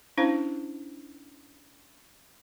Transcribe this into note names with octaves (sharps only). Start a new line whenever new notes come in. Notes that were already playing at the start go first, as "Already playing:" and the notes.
C#4 D4 E4 C5 F5